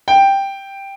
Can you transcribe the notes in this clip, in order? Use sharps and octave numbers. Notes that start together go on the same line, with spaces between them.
G5